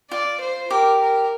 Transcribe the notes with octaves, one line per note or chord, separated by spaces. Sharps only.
F4 D5
C5
G4 A#4
A#4